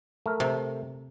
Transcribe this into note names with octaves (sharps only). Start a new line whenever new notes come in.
A3 A#4
C3